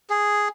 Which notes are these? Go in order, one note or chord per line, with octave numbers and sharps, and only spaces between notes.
G#4